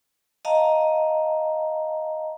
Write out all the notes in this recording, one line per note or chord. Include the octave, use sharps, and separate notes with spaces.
D#5 F5 A5 A#5